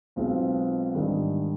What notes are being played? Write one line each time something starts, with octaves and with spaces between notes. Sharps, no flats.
B1 B2 G#3 C4 F4
G#2 D#3 G3 D4